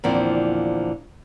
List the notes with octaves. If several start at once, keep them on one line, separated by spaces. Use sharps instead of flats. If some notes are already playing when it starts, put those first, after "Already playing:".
E2 A#2 D3 F3 A#3 C4